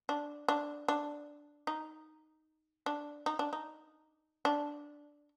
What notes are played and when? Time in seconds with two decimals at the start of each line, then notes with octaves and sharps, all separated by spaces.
0.09 D4
0.48 D4
0.88 D4
1.67 D#4
2.86 D4
3.26 D#4
3.39 D4
3.53 D#4
4.45 D4